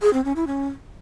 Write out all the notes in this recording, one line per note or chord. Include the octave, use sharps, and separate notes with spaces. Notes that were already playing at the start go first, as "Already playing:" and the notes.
G#4
C4
C#4
E4
C#4